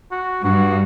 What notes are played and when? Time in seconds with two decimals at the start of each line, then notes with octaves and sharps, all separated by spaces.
0.11 F#4
0.44 G2 F#4